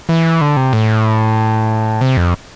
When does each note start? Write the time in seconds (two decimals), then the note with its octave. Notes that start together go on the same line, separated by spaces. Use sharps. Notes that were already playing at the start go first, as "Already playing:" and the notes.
0.09 E3
0.41 D3
0.57 C3
0.73 A2
2.01 C3
2.17 F2